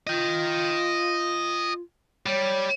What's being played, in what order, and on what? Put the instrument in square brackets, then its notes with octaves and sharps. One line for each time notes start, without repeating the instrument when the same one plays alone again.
[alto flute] F4 [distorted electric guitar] D#5 G5
[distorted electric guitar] G3 [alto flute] C#5